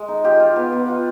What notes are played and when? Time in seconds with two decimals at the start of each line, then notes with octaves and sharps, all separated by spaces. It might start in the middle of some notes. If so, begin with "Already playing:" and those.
Already playing: G#3
0.08 D#4
0.24 F4 G4
0.40 F4
0.56 B3
0.72 B3
0.88 F4